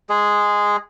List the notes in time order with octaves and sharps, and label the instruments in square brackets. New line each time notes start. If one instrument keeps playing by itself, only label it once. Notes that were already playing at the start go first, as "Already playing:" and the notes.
[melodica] G#3 G#4